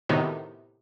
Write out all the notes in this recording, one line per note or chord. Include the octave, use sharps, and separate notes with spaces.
A2 C3 D#3 B3 D#4 F#4